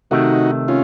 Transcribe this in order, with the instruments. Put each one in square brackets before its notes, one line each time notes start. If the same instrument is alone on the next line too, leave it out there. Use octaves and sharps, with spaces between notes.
[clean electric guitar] C3 D#3 A3 [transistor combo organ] D#4 F#4
[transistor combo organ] C#4 F4